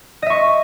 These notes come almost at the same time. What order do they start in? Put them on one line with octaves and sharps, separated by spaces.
D#5 E5 C#6